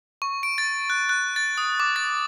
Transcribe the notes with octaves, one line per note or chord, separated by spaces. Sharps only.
C#6
D7
A6
F#6
F#6
A6
D#6
D6
A6